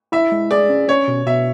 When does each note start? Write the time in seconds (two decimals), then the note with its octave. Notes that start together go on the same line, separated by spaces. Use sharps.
0.12 E4 E5
0.32 G#3
0.51 G#4 D5
0.70 C#4
0.88 C#4 C#5
1.08 B2
1.26 B2 E5